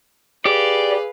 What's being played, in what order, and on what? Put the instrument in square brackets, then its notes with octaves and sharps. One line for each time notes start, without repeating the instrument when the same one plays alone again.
[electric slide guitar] G4 [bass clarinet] G#4 [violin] B4 F5 [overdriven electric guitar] D5